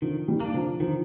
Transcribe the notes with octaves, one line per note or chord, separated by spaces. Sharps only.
D3 D#3 F3
D#3 G3
A#3 D4
D3 F3
D3 D#3 F3